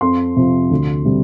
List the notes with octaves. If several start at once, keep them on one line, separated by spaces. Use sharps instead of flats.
F2 C6
C3 F3
D2
C3 G3